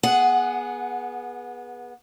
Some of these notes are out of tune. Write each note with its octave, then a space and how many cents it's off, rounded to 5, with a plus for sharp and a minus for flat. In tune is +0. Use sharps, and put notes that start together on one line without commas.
B3 -20 G#4 +0 F#5 +0